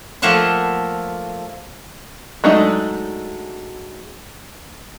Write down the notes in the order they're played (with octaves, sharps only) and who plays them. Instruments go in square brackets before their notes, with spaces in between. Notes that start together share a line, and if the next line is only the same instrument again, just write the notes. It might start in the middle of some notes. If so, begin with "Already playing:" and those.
[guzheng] F3 A3 A#3 E5 F#5 C6
[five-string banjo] F#3 G#3 A3 D4 D#4